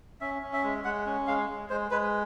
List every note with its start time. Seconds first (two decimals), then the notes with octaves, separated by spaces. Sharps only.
0.21 C#4 E5
0.42 C#4
0.53 E5
0.64 G#3
0.85 G#3 F#5
1.06 C#4
1.27 G#3 F5
1.49 G#3
1.70 G#3 C5
1.91 G#3 B4